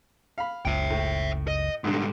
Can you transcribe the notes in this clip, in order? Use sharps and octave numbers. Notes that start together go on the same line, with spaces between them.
F5 B5
F#1 C#2 E5 G5
A2
D#5
B1 G#2 D3 G3